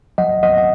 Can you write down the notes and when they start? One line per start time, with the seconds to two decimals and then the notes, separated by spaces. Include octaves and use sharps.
0.18 F#3 D#5 F#5
0.43 F#3 D#5 F#5
0.58 F#5